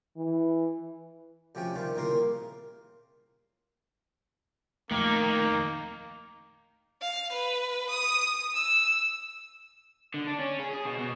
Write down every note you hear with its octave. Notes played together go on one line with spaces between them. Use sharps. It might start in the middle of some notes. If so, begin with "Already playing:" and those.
E3
D2 C3 F3 C#4 G5
C3 D#3 G3 F4
C2 A#2 C#3 A#3 A#4 C6
D#1 F2 D#3 A3 A#3
F5
B4
D#6
E6
D3
D4
C#4
G#4
G#4
B2
B2